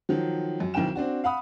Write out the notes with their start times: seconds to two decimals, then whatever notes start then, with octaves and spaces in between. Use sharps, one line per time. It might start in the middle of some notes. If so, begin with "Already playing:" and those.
0.09 D#3 F3 F#3
0.60 F#2
0.74 B1 D#3 C4 E4 G5 E7
0.96 C4 D4 F#4
1.24 F5 F#5 B5 D#6